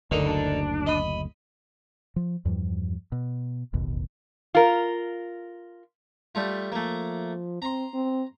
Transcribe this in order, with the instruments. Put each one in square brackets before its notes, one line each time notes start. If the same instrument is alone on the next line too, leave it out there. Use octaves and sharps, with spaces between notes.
[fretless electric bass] F#1 D2 [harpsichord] D3 D#4 A#4
[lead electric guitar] D4
[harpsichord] D#5 B5 D#6
[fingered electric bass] F3
E2 G2 F3 G3
B2
E1 A1 D#2 B2
[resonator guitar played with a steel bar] F4 A#4
[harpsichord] G3 A3 F4
[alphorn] F3 [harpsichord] A3 A#3
[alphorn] C4 [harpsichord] A#5 C6
[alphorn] C4